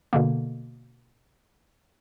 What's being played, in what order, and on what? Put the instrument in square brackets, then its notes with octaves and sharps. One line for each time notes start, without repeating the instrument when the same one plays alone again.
[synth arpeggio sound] B2 D3 A#3